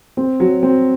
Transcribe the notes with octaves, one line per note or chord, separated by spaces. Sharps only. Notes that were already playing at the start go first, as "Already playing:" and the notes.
C4
F#3
C4